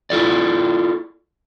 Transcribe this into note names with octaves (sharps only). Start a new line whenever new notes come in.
E4 F4 A4 D5